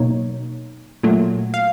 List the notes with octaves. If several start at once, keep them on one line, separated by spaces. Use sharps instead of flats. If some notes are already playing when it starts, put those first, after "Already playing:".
Already playing: B2 F#3 A#3 D#4 C#5
A#2 F#3 A3
F5